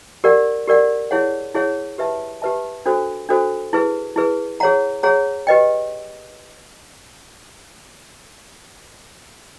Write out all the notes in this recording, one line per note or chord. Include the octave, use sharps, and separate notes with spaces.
G4 A#4 D5 F#5
G4 A#4 D5 F#5
E4 G#4 C#5 F#5
E4 G#4 C#5 F#5
G4 B4 E5 A5
G4 B4 E5 A5
D4 F#4 A4 C5
D4 F#4 A4 C5
E4 G#4 B4
E4 G#4 B4
G#4 C#5 F#5 A#5
G#4 C#5 F#5 A#5
G4 B4 D#5 G5